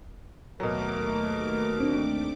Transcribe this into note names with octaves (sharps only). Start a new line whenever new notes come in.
D#2 B2 F#3 A3 A#4 D6
C4 D4